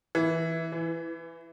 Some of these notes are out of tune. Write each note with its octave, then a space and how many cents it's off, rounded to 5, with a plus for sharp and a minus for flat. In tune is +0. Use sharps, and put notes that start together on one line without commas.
E3 -10
E3 +15